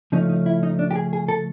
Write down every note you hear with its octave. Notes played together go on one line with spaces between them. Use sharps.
C#3 F3 A3 C#4 D#4
D#4
E4
D#4
D4
G4
G#4
G#4
A4